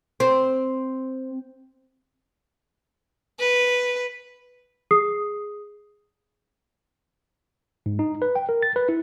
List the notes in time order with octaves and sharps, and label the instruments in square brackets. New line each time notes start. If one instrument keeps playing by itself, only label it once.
[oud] C4
[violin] B4
[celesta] G#4 D#6 C7
[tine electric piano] G#2
D#4
B4
G5
A#4
A6
B4
E4